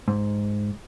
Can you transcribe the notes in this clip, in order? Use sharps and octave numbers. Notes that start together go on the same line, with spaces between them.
G#2